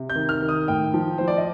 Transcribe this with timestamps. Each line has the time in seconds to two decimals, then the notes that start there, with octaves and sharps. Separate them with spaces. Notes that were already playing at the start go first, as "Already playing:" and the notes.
Already playing: C3
0.10 G6
0.15 D#3
0.29 F6
0.42 D#3
0.49 D#6
0.68 A2 G5
0.94 F3
1.18 F3 C5
1.28 D5
1.37 D#5